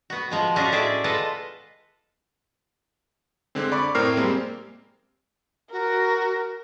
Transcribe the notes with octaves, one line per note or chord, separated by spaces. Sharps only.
B3 F#4
F3 G#3 B3
C#4 D4 F4 F#4 G#4 D#5
A2 G#3 F#4 G#4 D5 E5
G#3 F4 A4 B4 D#5
D3 G#3 C4
D5 B5 C#6 D6
A2 C4 A#4 A#5 F6 C7
G3 G#3 A#3 C4
F#4 A#4